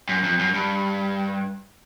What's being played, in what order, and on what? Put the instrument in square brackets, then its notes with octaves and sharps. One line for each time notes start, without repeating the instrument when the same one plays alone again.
[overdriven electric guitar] F#2
F2
F#2
G2